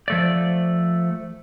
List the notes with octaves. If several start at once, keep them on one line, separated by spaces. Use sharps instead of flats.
F3 A3 D5